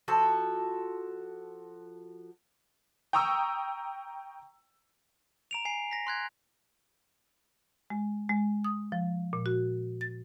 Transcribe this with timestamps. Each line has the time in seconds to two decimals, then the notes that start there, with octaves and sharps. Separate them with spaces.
0.08 F3 F#4 A4
3.13 G5 A#5 C#6 D#6 E6
5.51 A#5 D7 F7
5.65 G#5 C7
5.91 A#6 B6
6.07 C6 F#6 G#6
7.90 G#3
8.29 G#3
8.64 D#6
8.92 F3
9.33 A#2
9.46 F#4
10.01 A6